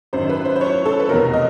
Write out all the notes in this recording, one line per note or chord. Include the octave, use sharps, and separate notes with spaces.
G#1 F#2 D#3 C5
B4
C5
C5
C#5
A4
B4
F1 E2 B2 A#4
D#5